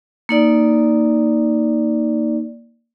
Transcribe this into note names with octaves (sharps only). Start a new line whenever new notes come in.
A#3 D#4 D5